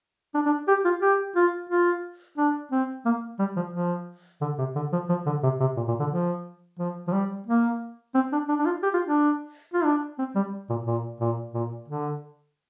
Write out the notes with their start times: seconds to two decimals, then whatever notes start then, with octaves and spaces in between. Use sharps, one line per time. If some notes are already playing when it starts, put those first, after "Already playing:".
0.34 D4
0.46 D4
0.68 G4
0.85 F4
1.02 G4
1.36 F4
1.70 F4
2.38 D4
2.72 C4
3.06 A#3
3.39 G3
3.57 F3
3.73 F3
4.41 D3
4.58 C3
4.75 D3
4.93 F3
5.09 F3
5.26 D3
5.43 C3
5.60 C3
5.77 A#2
5.88 A#2
6.00 D3
6.11 F3
6.79 F3
7.08 F3
7.13 G3
7.47 A#3
8.15 C4
8.32 D4
8.49 D4
8.59 D4
8.65 F4
8.83 G4
8.94 F4
9.06 D4
9.74 F4
9.84 D4
10.18 C4
10.36 G3
10.70 A#2
10.87 A#2
11.20 A#2
11.54 A#2
11.88 D3